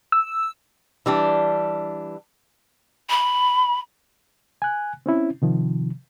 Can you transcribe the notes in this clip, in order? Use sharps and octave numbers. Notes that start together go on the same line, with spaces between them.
E6
E3 G3 D4
B5
G#5 F#6
C4 C#4 E4
C3 D#3 F3